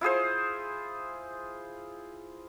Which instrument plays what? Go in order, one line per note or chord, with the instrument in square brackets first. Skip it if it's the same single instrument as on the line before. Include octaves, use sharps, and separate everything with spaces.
[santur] E4 F4 G#4 C5